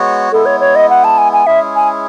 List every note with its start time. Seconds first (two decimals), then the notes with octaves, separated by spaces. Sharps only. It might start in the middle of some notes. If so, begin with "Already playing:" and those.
Already playing: G#3 B3 F#4 C#5
0.32 G#3 B3 E4 A4
0.46 C#5
0.60 C#5
0.76 D#5
0.90 F#5
1.04 A5
1.18 G#5
1.33 G#5
1.47 G#3 C#4 E4 G#4 E5
1.76 G#5